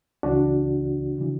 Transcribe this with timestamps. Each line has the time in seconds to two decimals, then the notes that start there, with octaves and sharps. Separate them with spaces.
0.23 C#2 C#3 E3 D4 F#4
1.19 C#3 E3